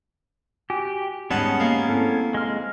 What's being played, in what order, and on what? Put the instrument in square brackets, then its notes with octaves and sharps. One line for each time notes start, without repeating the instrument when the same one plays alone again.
[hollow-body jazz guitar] F#4 G#5 [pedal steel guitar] G4
[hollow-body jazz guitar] G#2 G3 [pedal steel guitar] B3 C#4 G#4 [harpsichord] D#4 F#5 A5
[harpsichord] A#3
[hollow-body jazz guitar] C4 E4 A4
[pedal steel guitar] G#3 F6